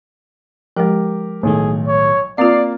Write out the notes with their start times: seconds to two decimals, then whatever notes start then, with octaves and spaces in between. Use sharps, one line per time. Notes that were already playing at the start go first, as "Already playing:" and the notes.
0.77 F3 G#3 G4 A#4
1.43 B1 A2 D#3 A3 G#4
1.88 C#5
2.38 A#3 C4 F4 D5 F5 C7